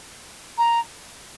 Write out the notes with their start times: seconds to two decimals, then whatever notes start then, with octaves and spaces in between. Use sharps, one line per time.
0.58 A#5